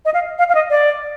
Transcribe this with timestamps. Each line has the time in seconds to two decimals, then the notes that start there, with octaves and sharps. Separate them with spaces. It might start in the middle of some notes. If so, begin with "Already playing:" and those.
0.05 D#5
0.14 F5
0.38 F5
0.49 F5
0.55 D#5
0.70 D5